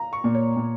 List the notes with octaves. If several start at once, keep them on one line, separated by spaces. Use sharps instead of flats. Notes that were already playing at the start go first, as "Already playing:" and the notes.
Already playing: F5 A#5
C#6
A#2
C#5
A#2